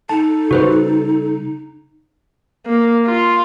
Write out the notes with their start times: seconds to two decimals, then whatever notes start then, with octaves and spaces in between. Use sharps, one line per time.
0.09 D#4 A4 A5
0.51 C#3 G3 F#4 B4 C5
2.67 A#3
3.06 F4